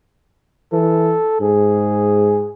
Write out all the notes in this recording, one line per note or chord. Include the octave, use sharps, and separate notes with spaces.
E3 A4
G#2 G#4